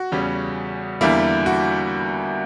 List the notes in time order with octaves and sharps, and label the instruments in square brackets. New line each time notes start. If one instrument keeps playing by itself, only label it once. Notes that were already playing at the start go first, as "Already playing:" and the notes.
Already playing: [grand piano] F#4
E2 C#3 G3 C#4
E2 D3 G3 A#3 E4
F#4